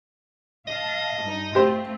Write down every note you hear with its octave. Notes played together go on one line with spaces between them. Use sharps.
D#5 F5 A5
G2 D#4
A3 C4 F4 G4 C5